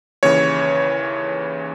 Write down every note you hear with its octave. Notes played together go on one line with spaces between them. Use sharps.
D#2 C#3 E3 C#5